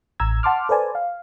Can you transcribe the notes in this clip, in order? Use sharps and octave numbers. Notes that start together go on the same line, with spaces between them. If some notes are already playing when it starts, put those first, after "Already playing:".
A1 A#5 E6 G#6
F#5 A5 C6 D6 F6
A4 B4 C5 D5 G#5 A5
F5